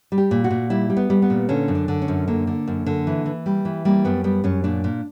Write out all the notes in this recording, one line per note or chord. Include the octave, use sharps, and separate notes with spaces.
G3
G4
A#2
F#4
A#2
G3 E4
G3
B3
G3
B3
A#2
D3 C#4
F#2
D4
D3
C#4
F#2
D3 A#3
D3
F#2
D3
E3
E3
G3
E3
G3 A#3
F#2 B3
G3 B3
F#2 C#4
A#2 D4
A#2